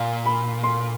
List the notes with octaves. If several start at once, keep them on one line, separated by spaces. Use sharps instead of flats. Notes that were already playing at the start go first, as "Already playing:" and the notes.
Already playing: A#2 F5
B5
C6